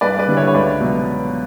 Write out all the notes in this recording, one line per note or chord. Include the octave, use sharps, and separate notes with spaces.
G2 B4 D5
B4 D5
D3 G3
C#5 E5
C#5
C#2 B4 D5
B2 F#3